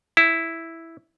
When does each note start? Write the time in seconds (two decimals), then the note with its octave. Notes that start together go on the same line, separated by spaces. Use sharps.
0.17 E4